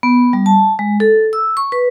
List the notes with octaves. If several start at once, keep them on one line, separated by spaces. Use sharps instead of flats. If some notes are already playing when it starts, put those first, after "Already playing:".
B3
G3
A5
G#3
A4
E6
C#6
B4